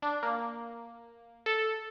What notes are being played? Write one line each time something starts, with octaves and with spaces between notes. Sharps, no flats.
D4
A#3
A4